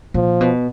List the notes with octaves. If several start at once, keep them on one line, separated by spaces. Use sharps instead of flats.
A#2 F3
B2